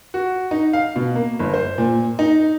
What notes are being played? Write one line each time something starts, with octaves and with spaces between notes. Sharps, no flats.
F#4
D#4
F5
B2
A#3
G1
C5
A#2
D#4